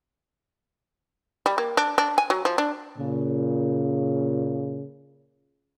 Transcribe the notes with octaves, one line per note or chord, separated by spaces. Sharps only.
G3
A#3
D4
D4
G#5
F#3
F3
D4
A#2 C#3